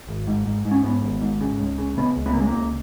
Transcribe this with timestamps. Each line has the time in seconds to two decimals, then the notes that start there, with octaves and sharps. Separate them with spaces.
0.09 G#1
0.27 G#2
0.46 G#2
0.65 G#2
0.71 C#4
0.84 G#2 B3
1.02 G#1
1.21 G#2
1.41 C#3
1.60 C#2
1.78 C#3
1.97 C#3 B3
2.16 C#2
2.26 B3
2.33 C#3 A#3
2.40 G#3
2.47 A#3
2.54 C#2